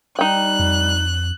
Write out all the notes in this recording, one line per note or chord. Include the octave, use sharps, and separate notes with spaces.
G3 D#4 G5 F#6
F2